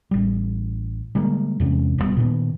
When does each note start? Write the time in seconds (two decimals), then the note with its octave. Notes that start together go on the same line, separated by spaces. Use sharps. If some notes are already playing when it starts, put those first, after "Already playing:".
0.11 A1 G3
1.15 D3 G3 G#3 A#3
1.60 E2 C3 G#3 C#4
1.98 D#1 G2 G3 B3
2.17 A#2 D#3 B3